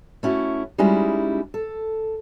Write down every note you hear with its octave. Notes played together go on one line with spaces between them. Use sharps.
A3 C#4 E4 F#4
G3 G#3 C#4 D#4 E4 F#4
A4